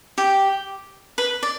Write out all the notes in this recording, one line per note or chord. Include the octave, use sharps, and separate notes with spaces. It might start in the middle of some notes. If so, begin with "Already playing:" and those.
G4
B4
D5